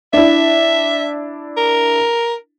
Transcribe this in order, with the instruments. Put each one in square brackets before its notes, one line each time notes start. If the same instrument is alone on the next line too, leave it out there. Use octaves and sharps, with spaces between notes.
[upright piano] D4 E4 [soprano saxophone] E5
[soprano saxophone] A#4